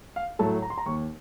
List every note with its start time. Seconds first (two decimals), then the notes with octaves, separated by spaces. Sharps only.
0.16 F5
0.39 A2 F#3 A3 A5
0.62 A#5
0.70 C6
0.78 A#5
0.86 D#2 C#6